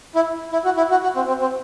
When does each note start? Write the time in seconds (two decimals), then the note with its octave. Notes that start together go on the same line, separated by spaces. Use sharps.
0.15 E4
0.53 E4
0.65 F#4
0.77 E4
0.91 F#4
1.03 F#4
1.16 C4
1.28 C4
1.41 C4